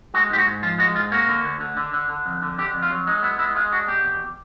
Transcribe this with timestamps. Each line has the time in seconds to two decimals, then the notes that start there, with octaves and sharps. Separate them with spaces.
0.14 G#3 F#4
0.30 G#2 G4
0.38 F#4
0.47 G#2
0.63 F3 F4
0.79 G#3 F#4
0.95 G#2 F4
1.12 A#3 F#4
1.28 D3
1.44 D2
1.60 D3
1.77 D3
1.93 D3
2.09 D3
2.26 F2
2.42 D3
2.58 D3 G4
2.74 F2
2.82 F4
2.91 F#3
3.07 G#3 D#4
3.23 B3 E4
3.39 G#3 E4
3.56 G#3 F4
3.72 D4 F#4
3.88 B2 G4
4.05 E2